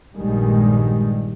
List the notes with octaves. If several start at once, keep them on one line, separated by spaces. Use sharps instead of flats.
A#1 G2 A#2 D#3 G3 G#3